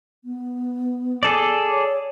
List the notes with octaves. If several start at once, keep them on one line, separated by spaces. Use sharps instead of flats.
B3
G#4 A4 D5
C#5